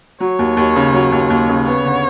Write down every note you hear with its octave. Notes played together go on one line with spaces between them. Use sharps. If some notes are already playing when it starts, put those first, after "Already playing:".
F#3 C#5
D#2
D#2
C#3
F#3
D#2
D#2
C#3
B3 C#5
D3